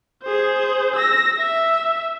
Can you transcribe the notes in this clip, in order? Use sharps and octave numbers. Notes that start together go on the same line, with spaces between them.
G#4 C5
E6 A#6
E5